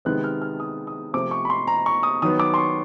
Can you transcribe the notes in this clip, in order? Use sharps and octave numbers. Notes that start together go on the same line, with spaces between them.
C3 D#3 G#3 B3 F#6
F6
F6
D#6
D#6
C3 F3 A3 C4 D6
C#6
B5
C6
A#5
C#6
D#6
D#3 F#3 B3 D#6
D6
C6
C#6